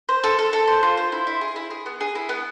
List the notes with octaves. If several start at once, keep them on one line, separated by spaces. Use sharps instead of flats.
C5
A4
A4
A4
C5
F4
C5
E4
E4
G#4
E4
G#4
B3
G#4
E4
B3